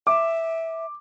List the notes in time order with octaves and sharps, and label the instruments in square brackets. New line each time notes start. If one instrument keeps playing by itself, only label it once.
[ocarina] E5 [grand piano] D6